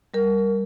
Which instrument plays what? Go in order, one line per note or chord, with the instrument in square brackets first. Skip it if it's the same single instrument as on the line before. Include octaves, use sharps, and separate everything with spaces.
[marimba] G3 A#4